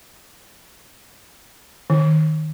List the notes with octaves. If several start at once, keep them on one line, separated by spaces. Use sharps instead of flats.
D#3